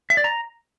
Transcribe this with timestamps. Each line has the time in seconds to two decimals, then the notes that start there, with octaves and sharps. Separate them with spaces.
0.10 E5
0.17 D5
0.24 A#5